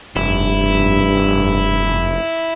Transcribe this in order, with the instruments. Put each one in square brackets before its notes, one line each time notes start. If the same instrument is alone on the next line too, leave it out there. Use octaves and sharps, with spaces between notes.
[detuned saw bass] F1 [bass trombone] G2 [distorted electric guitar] E4